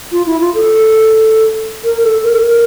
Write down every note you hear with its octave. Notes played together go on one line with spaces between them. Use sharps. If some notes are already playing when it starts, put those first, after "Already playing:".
F4
E4
F4
A4
A#4
A4
A#4
A4
A#4